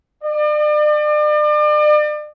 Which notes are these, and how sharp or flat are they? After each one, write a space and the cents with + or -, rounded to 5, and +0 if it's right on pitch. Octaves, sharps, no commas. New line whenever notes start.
D5 +40